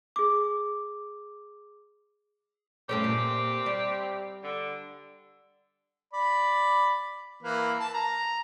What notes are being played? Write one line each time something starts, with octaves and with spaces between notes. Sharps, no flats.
G#4 D6
G2 C3 A3 C4 C#4 G4
A#2
G3
D3
D5 B5
E3 A#3 B4
A5
A#5